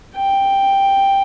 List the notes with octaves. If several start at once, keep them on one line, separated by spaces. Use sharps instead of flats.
G5